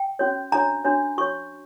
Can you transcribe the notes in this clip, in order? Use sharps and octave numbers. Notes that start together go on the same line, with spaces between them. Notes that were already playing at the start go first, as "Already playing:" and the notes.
Already playing: G5
C#4 F#4 C#5
D4 F#4 C#5 A#5
D4 F#4 C#5
F#4 C#5 C#6